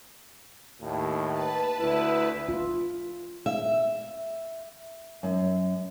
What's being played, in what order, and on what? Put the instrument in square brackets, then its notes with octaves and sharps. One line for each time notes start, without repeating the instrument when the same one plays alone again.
[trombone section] D#2 A2
[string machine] B4 A5
[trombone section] D2 E4
[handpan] F4
[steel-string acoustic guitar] E5
F#2